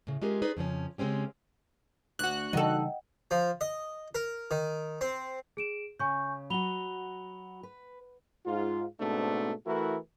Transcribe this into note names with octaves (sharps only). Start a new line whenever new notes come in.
A2 C#3
G#3 C#4 F4 G4 G#4 A#4
D#4 G#4 B4 C5 D5 D#5
F2 C#3 F3 C#4
C#3 G#3 C4 C#4 G4
D2 F#4 F#6
C#3 E3 G3 D#4 A4 D#5 F#5 G5
F3
D#5
A#4
D#3
C4
G#4 D7 E7
C#3 G#5 C#6 G6
F#3 F#4 B5 F7 G7
B4
G#2 F4
G#2 B2 A3 C4 D4
E3 A3 E4 F#4 A#4